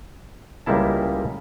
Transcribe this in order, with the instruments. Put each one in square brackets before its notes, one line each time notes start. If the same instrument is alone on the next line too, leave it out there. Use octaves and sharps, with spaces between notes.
[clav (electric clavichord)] C#2 G3 G#3 A#3 E4 A5